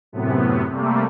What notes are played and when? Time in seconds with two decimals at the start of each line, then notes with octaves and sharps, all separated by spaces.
0.12 F#2 A2 C3 B3
0.70 C3 G3 A3 A#3